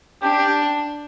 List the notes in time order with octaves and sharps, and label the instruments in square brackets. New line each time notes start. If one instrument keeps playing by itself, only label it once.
[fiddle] D4 [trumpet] G4